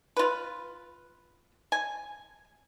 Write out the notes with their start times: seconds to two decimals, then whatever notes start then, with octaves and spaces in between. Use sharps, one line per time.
0.17 F4 B4
1.72 G#5